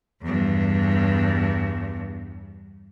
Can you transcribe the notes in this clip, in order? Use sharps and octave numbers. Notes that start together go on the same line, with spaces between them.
E2 G2